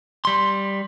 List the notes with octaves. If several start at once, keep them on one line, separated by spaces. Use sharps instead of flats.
G3 C6